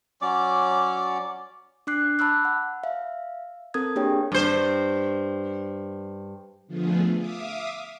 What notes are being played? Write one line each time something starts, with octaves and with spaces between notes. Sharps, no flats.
F#3 C#4 D5 D6
D4 D6 F#6 C7
A5 B5 D6 E6 F#6
F#5
E5 F5
C4 A4 A#4 D#6 G#6
A#3 D4 G4 G#4 C#5 G5
G2 C5
D3 F3 A3 B3 F4 G#4
E5 F5 D6 D#6